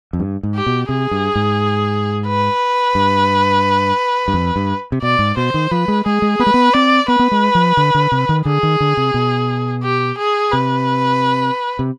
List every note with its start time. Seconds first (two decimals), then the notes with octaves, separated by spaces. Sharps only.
0.13 F2
0.20 G2
0.43 G#2
0.55 G4
0.67 B2
0.89 C3 G#4
1.11 G2
1.36 G#2
2.27 B4
2.95 G2
4.28 G2
4.34 F2
4.56 G2
4.92 C3
5.02 B2 D5
5.19 G#2
5.37 B2 C5
5.54 D#3
5.71 F3 B4
5.88 G#3
6.06 G#3 G#4
6.22 G#3
6.39 B3 B4
6.47 G#3
6.54 B3
6.73 C4 D5
7.08 B3 B4
7.19 B3
7.32 G#3
7.55 F3
7.77 D3
7.95 D3
8.12 C3
8.29 D#3
8.45 D3 G#4
8.63 D#3
8.80 D3
8.97 C3
9.14 B2
9.83 G4
10.18 G#4
10.52 C3 B4
11.79 C3